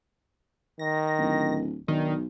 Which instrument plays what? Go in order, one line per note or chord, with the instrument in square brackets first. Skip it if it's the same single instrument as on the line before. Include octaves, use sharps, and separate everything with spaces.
[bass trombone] D#3 [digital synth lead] A#6
[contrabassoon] D1
[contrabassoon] B1 [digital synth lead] D#3 [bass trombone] D4